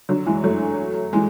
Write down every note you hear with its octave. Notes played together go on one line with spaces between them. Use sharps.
D3 F#3
E3 G#3
F#3 A3
E3 G#3